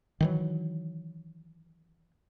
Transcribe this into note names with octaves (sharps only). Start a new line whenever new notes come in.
D#3 E3 F#3